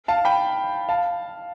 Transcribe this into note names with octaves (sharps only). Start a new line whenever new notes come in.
F5 A5
G5 B5
F5 A5